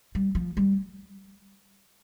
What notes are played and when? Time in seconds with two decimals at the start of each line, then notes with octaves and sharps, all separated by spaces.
0.15 G3
0.35 F3
0.57 G3